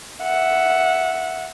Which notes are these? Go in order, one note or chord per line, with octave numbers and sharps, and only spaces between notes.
E5 F#5